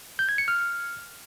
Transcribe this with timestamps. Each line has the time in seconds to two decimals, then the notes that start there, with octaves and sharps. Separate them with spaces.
0.19 G6
0.29 G#6
0.38 C#7
0.48 F6